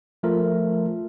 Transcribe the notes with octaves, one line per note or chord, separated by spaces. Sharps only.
F3 A3 F4 A#4